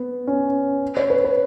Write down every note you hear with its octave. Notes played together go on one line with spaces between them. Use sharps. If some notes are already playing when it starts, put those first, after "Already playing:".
Already playing: B3
C#4
C#5
B4
B4